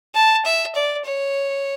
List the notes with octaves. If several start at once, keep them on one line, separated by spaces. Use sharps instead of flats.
A5
E5
D5
C#5